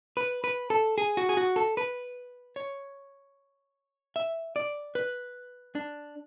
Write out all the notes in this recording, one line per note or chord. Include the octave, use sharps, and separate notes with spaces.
B4
B4
A4
G#4
F#4
G#4
F#4
A4
B4
C#5
E5
D5
B4
D4